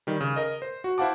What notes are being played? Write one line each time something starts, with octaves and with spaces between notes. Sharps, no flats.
D#3 G3
C#3
A#4 D#5
C5
F#4
E4 C5 F5 F#5 A5 D6